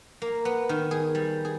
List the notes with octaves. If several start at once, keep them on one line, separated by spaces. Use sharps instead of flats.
A#3
B3
D#3
G#4
G3
G#4